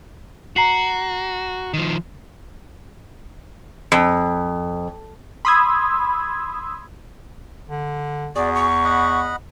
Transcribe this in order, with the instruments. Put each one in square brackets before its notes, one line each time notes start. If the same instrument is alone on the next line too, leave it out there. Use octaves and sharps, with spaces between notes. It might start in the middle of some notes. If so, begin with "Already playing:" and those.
[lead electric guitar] F#4 [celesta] A#5 C7 F#7
[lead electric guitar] D#3 F3
[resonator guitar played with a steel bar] F2
[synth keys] B5 C6 D#6 E6 G#6
[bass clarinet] D3
[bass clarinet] E2 [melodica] F#4 G#4 [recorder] D5
[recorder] C#6
[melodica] D#5 F#5 B5